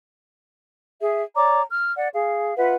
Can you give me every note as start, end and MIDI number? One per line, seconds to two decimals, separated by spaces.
1.00 1.22 68
1.00 1.22 76
1.36 1.62 73
1.36 1.62 74
1.36 1.62 82
1.36 1.62 86
1.70 1.93 89
1.96 2.08 74
1.96 2.08 78
2.13 2.55 68
2.13 2.55 77
2.57 2.74 65
2.57 2.74 71
2.57 2.74 76
2.57 2.74 78